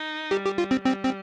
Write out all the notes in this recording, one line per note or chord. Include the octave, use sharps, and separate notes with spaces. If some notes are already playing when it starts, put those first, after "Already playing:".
Already playing: D#4
G3 G4
G4
F4
C4
G3 C4
C4